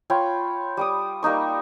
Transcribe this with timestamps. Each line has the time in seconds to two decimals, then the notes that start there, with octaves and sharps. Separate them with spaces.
0.10 F4 C#5 G5 B5
0.77 G3 D6 D#6
1.23 G3 A#3 D#4 C#6